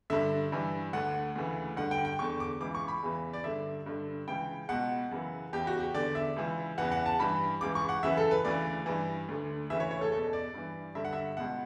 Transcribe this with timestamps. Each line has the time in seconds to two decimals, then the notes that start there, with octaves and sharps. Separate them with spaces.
0.10 G2 D3 E5
0.52 G2 E3
0.93 D2 D3 F#5
1.36 D2 C#3 E3
1.77 G2 D3 F#5
1.91 G5
2.05 G5
2.19 E2 D3 C#6
2.40 D6
2.60 C#2 C#3 E3 D6
2.75 C#6
2.88 B5
3.03 E2 C#3 E3
3.33 D5
3.44 G2 D3 E5
3.86 G2 D3
4.28 C#2 C#3 E3 G5
4.69 C#2 B2 F#5
5.11 F#2 C#3 E3
5.53 E2 C#3 E3 G4
5.67 F#4
5.80 G4
5.94 E2 D3 D5
6.15 E5
6.36 C#2 C#3 E3
6.78 E2 C#3 E3 F#5
6.92 F#5
7.06 A5
7.19 G2 E3 B5
7.61 C#2 C#3 E3 D6
7.75 C#6
7.89 F#5
8.03 F#2 C#3 E3 E5
8.17 A4
8.31 B4
8.45 D2 C#3 E3 D5
8.86 G2 E3
9.28 D2 D3
9.70 D2 C#3 E3 E5
9.80 C#5
9.91 C#5
10.01 A4
10.12 E2 B2 A4
10.33 D5
10.54 G2 E3
10.95 G2 D3 E5
11.05 F#5
11.13 E5
11.37 C#2 B2 F#5